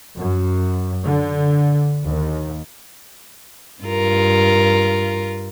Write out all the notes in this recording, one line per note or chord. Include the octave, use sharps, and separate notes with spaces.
F#2
D3
D#2
G2 F4 A#4